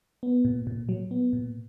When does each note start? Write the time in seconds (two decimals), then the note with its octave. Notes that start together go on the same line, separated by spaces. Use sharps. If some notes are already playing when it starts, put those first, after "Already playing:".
0.23 B3
0.45 A#2
0.67 A#2
0.89 F#3
1.11 B3
1.33 A#2